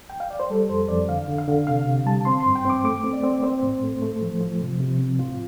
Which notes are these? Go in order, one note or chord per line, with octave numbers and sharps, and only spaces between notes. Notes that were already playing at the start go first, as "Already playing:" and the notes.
G5
F5
D5
C5
G3 A4
F2 C5
F2 D5
D3 F5
D3
F5
D3
C3 F5
C3
G3 A5
C4 C6
C6
G2
G5
C4 D6
A3 D6
C4
D5
C4
C4 C5
A2
A3
A3
F3
F3
C3
C3
C4
A2 F4